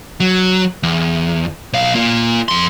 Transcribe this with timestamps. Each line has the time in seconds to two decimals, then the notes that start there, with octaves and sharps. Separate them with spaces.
0.20 F#3
0.83 E2
1.73 B1 F5
1.94 A#3 F4
2.48 F2 C6